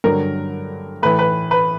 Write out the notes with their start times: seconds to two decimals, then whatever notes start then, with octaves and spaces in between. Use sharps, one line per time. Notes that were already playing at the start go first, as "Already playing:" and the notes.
0.04 G2 D3 F#3 A#4
1.03 A2 E3 B4
1.19 B4
1.51 B4